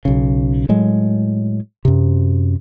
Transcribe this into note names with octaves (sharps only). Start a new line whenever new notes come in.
B1 C#3
A2 F#3 G#3
F#2 C3